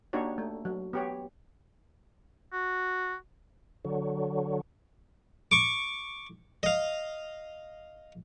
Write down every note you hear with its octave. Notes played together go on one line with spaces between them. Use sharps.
A#3 D4 D#4 F#4 G4 C#5
A3
F#3
B3 G4 C#5
F#4
D3 F#3
C#6 D6
D#5 F5